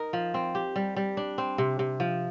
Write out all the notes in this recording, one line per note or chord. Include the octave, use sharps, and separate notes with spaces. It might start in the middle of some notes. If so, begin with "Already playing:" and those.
Already playing: D#4 A#4
F3
C4
G4
G3
G3
D4
C4
C3
C3
F3